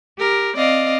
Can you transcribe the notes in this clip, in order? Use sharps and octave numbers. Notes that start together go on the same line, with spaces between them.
G4 A#4
C4 D5 D#5 F5